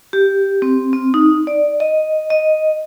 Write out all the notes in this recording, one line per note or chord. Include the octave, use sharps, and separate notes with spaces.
G4
C4
C4
D#4
D5
D#5
D#5